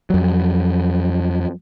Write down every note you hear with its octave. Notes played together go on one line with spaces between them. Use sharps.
F2 F#3